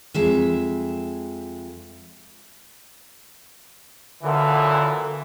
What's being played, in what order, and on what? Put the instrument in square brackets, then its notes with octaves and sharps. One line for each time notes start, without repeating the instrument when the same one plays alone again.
[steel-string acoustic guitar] F2 G#3 E5
[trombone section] F#2 A#2 E3 [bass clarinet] D3